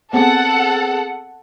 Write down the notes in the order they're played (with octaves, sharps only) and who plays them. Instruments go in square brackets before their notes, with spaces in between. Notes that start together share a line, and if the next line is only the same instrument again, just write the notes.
[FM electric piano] B3 C4 G#4 [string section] A4 F#5